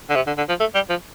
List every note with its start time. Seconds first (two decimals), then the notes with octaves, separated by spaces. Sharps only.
0.10 D3
0.16 C3
0.27 D3
0.38 D3
0.49 F3
0.60 A3
0.75 G3
0.90 F3